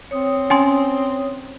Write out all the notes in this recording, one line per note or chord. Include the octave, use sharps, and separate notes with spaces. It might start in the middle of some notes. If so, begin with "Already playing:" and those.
C4 C#5 D#6
C#4 G5 G#5 C6